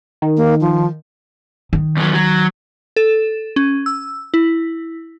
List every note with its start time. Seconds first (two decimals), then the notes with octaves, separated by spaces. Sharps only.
0.22 D#3
0.37 A#3
0.61 F3
1.73 D#3
1.97 E2 F#3
2.15 F#3
2.96 A4
3.56 C#4
3.86 E6
4.34 E4